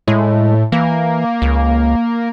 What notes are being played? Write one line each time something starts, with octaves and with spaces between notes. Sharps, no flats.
A2 G#3
E3 A#3
C#2